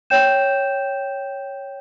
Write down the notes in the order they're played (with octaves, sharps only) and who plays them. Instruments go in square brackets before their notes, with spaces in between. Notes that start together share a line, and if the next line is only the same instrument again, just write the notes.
[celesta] C#5 G5 G6 E7